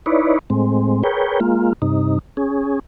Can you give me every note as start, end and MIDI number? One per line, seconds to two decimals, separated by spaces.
0.06 0.39 63
0.06 0.39 64
0.06 0.39 71
0.06 0.39 73
0.06 0.39 74
0.50 1.03 45
0.50 1.03 56
0.50 1.03 60
1.03 1.40 68
1.03 1.40 70
1.03 1.40 71
1.03 1.40 73
1.03 1.40 79
1.40 1.73 56
1.40 1.73 58
1.40 1.73 65
1.82 2.19 43
1.82 2.19 48
1.82 2.19 63
2.37 2.79 61
2.37 2.79 68